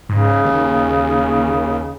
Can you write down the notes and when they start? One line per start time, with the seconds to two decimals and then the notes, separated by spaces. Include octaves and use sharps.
0.09 G#2 C#3
0.44 D#2